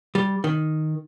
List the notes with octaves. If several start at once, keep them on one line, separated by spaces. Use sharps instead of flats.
G3
D#3